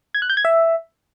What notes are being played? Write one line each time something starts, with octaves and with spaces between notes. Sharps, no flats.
G#6
F#6
G6
G#6
E5